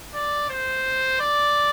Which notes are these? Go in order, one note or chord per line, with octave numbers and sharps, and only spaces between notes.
D5
C5
D5